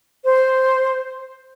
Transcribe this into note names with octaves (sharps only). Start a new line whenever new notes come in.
C5